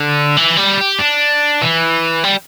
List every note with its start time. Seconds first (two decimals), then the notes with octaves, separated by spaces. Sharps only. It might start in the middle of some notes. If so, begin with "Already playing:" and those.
Already playing: D3
0.37 E3
0.58 G3
0.78 G4
0.99 D4
1.62 E3
2.24 G3